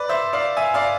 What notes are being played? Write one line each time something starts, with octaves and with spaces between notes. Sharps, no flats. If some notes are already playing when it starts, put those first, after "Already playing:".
Already playing: B4 D5
C5 E5
D5 F5
E5 G#5
D5 F5